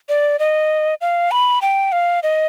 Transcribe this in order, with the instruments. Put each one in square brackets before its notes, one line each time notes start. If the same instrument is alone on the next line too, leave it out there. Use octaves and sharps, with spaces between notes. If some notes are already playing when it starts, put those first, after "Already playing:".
[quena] D5
D#5
F5
B5
G5
F5
D#5